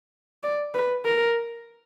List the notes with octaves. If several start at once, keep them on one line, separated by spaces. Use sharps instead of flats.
D5
B4
A#4